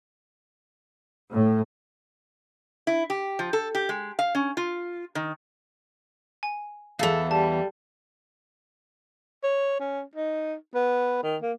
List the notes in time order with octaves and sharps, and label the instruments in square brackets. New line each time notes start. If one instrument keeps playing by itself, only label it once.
[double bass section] A2
[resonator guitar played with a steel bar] E4
G4
F3
A4
G4
G#3
F5
C#4
F4
D#3
[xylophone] G#5
[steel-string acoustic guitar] E2 E3 [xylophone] G#4 F5 [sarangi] A4
[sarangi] G3 [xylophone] A5
[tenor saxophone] C#5
C#4
D#4
B3
D#3
A#3